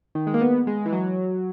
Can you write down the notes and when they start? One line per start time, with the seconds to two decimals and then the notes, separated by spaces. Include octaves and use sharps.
0.15 D#3
0.27 G#3
0.34 A#3
0.41 B3
0.67 G#3
0.85 E3
0.92 F#3